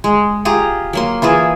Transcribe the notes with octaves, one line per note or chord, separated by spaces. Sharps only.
G#3
F4 G4 G#4 A#5
F#3 A#3 C6
E3 F4 G#4 E5